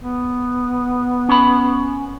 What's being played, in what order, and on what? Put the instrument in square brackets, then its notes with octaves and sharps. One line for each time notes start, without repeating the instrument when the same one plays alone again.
[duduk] B3
[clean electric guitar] C#4 B5